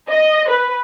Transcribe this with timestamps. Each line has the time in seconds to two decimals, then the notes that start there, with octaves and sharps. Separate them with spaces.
0.10 D#5
0.49 B4